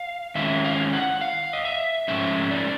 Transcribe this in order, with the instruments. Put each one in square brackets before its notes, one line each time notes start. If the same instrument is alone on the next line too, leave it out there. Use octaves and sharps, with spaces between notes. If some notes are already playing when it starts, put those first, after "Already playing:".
Already playing: [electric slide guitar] F5
D#3 G#3 C#4 E4 E5
F5
F#5
F5
D#5
E5
G#2 F3 A3 C#4 E5
D5